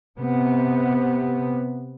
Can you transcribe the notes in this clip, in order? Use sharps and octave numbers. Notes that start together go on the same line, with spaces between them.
C3 B3